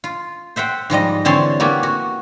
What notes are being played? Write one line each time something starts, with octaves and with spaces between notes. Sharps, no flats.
F4
C5 E5 F#5 G5
G#2 F3 G3 D#5
D3 E3 C4 C#5 A5 C6
A#3 B3 E4 F#4 G4 G#5
F#4